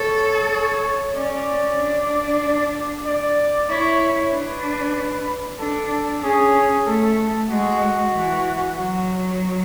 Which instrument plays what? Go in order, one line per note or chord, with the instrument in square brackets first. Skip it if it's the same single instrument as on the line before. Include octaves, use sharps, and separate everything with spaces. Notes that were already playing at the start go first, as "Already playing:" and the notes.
Already playing: [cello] A4 [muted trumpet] C#5
[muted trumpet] C#5
[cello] C#4 [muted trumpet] D5
[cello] D4
[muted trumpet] D5
[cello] E4 [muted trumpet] C#5
[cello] D4 [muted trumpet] B4
[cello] D4 [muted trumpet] A4
[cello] C#4 [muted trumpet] G#4
[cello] A3 [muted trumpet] A4
[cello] G#3 [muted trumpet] F#4
[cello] E3
F#3